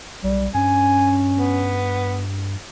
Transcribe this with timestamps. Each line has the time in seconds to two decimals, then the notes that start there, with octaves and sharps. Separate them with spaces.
0.24 B1 G3
0.54 G2 C#4 G#5
1.37 B3